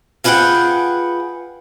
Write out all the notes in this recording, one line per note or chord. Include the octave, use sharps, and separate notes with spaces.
F4 G#4 B4 D#5 F#5 G5